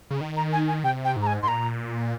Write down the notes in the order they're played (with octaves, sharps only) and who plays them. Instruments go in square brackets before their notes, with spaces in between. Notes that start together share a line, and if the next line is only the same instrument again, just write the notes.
[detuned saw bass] C#3
D#3
[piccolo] A#5
G#5
G#5
[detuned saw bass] C3 [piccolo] G5
[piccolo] G5
[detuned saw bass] G#2
[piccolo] A#5
G#5
[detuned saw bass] G#2 [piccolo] C6
[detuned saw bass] A#2 [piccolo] A#5